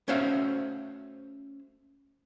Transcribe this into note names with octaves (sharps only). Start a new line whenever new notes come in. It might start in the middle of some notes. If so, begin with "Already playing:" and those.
A3 C#4 F#4 C5 E5 F5